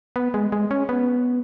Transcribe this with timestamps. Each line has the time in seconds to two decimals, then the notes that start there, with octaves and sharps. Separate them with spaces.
0.16 B3
0.34 G#3
0.52 G#3
0.71 C#4
0.89 B3